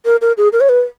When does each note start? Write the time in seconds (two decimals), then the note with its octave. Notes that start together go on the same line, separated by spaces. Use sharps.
0.05 A#4
0.21 A#4
0.38 G#4
0.53 A#4
0.61 C#5
0.69 B4